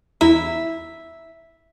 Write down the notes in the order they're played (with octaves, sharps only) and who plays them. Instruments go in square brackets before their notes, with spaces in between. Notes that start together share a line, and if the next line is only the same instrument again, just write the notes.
[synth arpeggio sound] E2 E4 A#5 [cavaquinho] E5